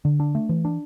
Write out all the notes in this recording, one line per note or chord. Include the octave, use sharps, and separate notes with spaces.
D3
D4
A3
E3
D4